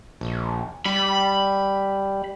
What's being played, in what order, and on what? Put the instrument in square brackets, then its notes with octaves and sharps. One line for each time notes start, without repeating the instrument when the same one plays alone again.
[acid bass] A#1
[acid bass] G3 [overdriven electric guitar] B5